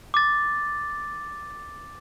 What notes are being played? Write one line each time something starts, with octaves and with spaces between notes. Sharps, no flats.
D6 A6